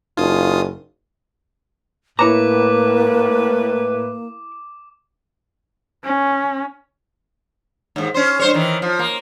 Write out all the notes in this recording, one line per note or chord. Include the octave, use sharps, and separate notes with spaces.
F#1 D#4 F4 D#6
A2 A#3 E4 B4 C#5 A#5 D6
C#4
D#2 G#2
C#4 C5
G2 C5 C#5
D#3 E3
F3
A#3